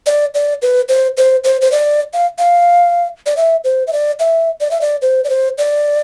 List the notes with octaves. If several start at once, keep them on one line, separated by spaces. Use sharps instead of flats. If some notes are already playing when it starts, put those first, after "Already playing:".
D5
D5
B4
C5
C5
C5
C5
D5
F5
F5
D5
E5
C5
E5
D5
E5
D5
E5
D5
C5
D5
C5
D5